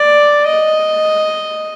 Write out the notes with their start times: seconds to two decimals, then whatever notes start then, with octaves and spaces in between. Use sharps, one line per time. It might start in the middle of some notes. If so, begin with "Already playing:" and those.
Already playing: D5
0.47 D#5